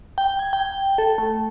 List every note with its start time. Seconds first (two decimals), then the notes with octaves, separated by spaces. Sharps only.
0.18 G5
0.39 G#6
0.53 G5
0.98 A4
1.18 A3